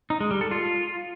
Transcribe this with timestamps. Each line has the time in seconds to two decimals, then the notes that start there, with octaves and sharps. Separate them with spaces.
0.10 D#4
0.21 G#3
0.31 G3
0.41 A4
0.51 F4